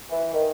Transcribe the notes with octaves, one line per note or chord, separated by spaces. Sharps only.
E3
D#3